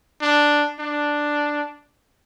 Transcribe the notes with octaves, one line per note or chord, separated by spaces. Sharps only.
D4
D4